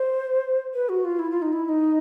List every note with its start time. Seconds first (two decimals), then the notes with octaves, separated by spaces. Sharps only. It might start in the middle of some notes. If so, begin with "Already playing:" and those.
Already playing: C5
0.74 B4
0.89 F#4
1.04 F4
1.19 E4
1.31 F4
1.42 D#4
1.53 E4
1.65 E4
1.69 D#4